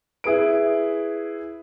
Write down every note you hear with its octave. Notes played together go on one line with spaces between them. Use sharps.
E4 G#4 B4 D7